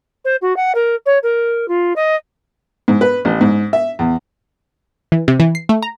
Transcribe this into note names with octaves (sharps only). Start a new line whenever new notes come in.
C5
F#4
F#5
A#4
C#5
A#4
F4
D#5
G#2
B4
A1
G#2
E5
E2
E3
C3
E3
C7
A3
A#5